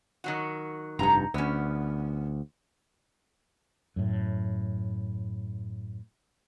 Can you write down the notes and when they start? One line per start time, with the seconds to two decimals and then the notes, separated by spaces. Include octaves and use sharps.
0.24 D#3 F#3 F#4
0.99 F1 G2 D#4 A#5
1.34 D2 B3 C#4
3.96 F#2 A2